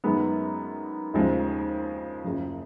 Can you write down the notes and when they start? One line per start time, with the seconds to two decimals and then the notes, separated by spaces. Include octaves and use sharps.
0.04 F#2 D#3 G#3 B3
1.14 D#2 C#3 F3 G#3
2.24 F#1 F#2 C#3 F3